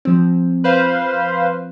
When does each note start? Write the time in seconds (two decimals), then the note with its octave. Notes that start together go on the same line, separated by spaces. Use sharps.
0.05 F3 C4
0.64 B4 C5 F5